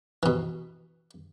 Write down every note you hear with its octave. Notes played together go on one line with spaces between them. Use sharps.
B2 E3